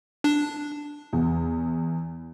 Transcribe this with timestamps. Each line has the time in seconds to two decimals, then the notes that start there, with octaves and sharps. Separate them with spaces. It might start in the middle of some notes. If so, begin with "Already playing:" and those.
0.24 D4
1.13 E2